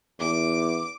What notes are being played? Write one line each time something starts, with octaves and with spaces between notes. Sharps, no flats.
E2 D6